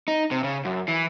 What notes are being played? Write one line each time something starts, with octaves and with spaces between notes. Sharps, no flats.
D#4
C3
C#3
F#2
E3